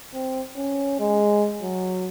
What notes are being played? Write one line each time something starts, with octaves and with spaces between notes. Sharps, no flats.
C4
C#4
G#3
F#3